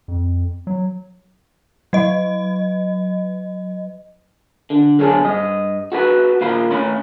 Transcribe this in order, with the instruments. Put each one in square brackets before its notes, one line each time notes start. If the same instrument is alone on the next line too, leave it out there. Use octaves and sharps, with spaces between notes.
[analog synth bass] F2
F#3
[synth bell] F#3 D#5
[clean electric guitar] D3
B1 D3 C#4 G#4 A4
G2 D#5
F#4 A4 B4
A#2 D#3 F5 B5
A2 C#4 B5